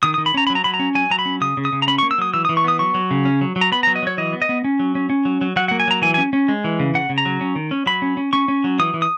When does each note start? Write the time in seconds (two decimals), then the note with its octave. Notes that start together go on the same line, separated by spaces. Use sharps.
0.03 D#3 D#6
0.14 D#6
0.18 D#3
0.26 B5
0.34 C#4 A#5
0.47 F#3 B5
0.55 A#5
0.64 F#3 B5
0.74 A#5
0.79 C#4
0.95 F#3 G#5
1.10 F#3 A#5
1.19 B5
1.26 C#4
1.41 C#3 D#6
1.57 C#3
1.65 D#6
1.73 C#3
1.82 A#5
1.87 C#4 B5
1.98 C#6
2.03 A#3
2.11 E6
2.18 F#3 D#6
2.34 E3 E6
2.45 D#6
2.49 E3
2.57 C#6
2.64 B3 D#6
2.79 F#3 C#6
2.94 F#3
3.11 C#3
3.25 C#4
3.41 F#3
3.56 F#3
3.61 A#5
3.72 B3 B5
3.83 A#5
3.87 F#3
3.96 D#5
4.03 F#3 C#5
4.18 E3 D#5
4.33 B3
4.42 D#5
4.49 B3
4.64 C#4
4.79 F#3
4.95 C#4
5.10 C#4
5.25 F#3
5.41 F#3
5.56 F#3 F#5
5.68 A#3 F#5
5.80 G#5
5.88 F#3 A#5
6.02 E3 G#5
6.14 G#5
6.18 C#4
6.33 C#4
6.48 G#3
6.64 E3
6.80 C#3
6.94 C#3 F#5
7.09 C#3
7.18 A#5
7.25 F#3
7.41 C#4
7.56 D#3
7.71 C#4
7.86 F#3 B5
8.02 C#4
8.17 C#4
8.33 C#4 C#6
8.48 C#4
8.64 F#3
8.79 E3 D#6
8.94 E3
9.02 D#6